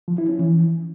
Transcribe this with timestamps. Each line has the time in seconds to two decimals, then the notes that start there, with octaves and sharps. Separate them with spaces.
0.08 F3
0.18 E4
0.29 C#4
0.39 E3